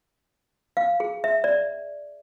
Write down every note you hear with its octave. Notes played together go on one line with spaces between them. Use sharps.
F5
G#4
E5
D5